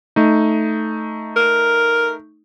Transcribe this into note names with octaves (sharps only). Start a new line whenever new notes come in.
A3 D#4
A#4